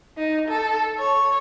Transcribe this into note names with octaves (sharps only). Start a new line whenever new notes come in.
D#4
A4
C#5